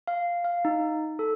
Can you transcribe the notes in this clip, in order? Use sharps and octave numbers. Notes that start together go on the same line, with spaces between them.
F5
F5
D#4
A4